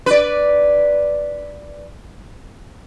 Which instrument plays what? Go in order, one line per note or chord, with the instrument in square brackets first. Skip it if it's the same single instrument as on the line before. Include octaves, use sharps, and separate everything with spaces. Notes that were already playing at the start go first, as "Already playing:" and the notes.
[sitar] B4 D5